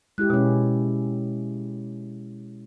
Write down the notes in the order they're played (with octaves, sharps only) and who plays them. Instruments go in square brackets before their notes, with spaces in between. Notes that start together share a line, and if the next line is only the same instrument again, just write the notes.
[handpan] G#3 E4 G4 [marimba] F#6
[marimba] B2 [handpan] G#3 C#4